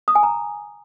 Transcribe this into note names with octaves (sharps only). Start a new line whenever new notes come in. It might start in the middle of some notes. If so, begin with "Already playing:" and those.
D#6
G#5
A#5